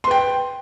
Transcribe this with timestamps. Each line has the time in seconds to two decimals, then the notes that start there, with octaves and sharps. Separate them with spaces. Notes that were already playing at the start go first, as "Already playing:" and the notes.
0.04 C6
0.07 B4
0.11 G5